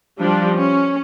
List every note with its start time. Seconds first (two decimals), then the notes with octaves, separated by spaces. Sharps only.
0.20 F3 G3 D4
0.56 C#4